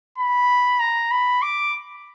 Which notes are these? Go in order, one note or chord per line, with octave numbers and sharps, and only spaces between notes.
B5
A#5
B5
D6